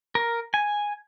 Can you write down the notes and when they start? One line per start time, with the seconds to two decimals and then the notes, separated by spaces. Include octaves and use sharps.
0.15 A#4
0.54 G#5